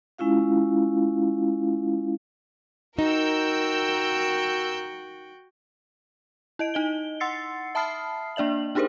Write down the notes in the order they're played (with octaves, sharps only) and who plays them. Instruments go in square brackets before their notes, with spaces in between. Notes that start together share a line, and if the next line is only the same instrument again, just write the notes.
[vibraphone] G#3 C#4 E4 F4 F5
[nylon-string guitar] D#4 [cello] F#4 G5 [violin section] A#4 E6 G6
[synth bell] E4 D#5 D7
D#4 D#5 G7
F#5 C6 E6 A6 C7 C#7
E5 A5 B5 D#6 F6 C7
A#3 D4 D5 E5 F#7
D4 D#4 G4 G#4 A#4 C5